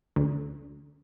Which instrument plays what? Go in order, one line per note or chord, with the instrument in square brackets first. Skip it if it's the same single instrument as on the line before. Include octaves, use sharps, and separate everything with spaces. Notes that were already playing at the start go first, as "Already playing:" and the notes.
[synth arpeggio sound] D2